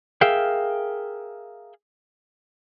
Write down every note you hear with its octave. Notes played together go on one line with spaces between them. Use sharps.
G#4 A#4 E5 F5 G5